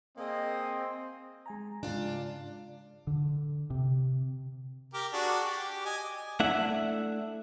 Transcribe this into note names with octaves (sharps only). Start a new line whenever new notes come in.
A#3 C4 G#4 D#5
G#3 G#5 A#5
G#2 C#3 G#3 D4 F4
D3
C3
G4 A#4
D4 F#4 G#4
G4
D#5 G#5
A3 D4 E4 E5 F#5